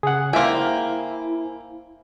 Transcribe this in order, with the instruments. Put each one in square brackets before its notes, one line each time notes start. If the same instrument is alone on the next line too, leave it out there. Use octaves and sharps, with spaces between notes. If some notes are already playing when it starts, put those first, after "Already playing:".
[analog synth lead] C#3 [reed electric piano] G#4 F#5
[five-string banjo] A#3 G5 [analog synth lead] E4 [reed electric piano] C5 E5 G#5